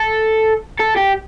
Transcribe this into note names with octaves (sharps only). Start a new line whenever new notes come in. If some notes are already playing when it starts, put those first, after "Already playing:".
Already playing: A4
A4
G4